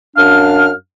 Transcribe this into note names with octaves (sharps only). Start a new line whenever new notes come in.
F#2 D4 F5 F6